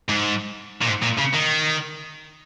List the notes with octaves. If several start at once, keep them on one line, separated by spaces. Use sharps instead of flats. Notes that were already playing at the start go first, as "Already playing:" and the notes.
G#2
A#2
G#2
A#2
C#3
D#3